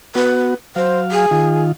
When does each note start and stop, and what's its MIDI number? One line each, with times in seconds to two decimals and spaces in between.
0.15 0.54 59
0.15 0.54 66
0.15 0.52 71
0.76 1.26 54
0.76 0.99 72
0.76 1.26 77
1.12 1.61 68
1.31 1.72 51
1.31 1.72 65